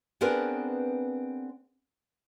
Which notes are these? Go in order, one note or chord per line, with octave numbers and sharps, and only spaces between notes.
B3 C4 D4 G#4 A#4 B4